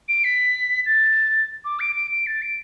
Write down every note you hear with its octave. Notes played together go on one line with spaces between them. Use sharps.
D7
B6
A6
D6
D7
D7
D7
A6
D7